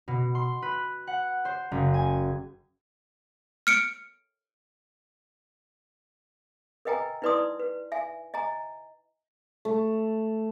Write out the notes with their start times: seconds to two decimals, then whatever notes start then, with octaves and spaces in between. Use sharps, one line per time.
0.08 B2
0.35 C6
0.62 B4
1.07 F#5
1.45 C5
1.71 F#1
1.94 G#5
3.67 F6 C#7 D7
6.85 A#4 B4 D#5 G5 G#5 A#5
7.22 D#4 E4 B4 D5 C6 D#6
7.60 B4
7.92 E5 G#5
8.34 D#5 G#5 A#5
9.65 A3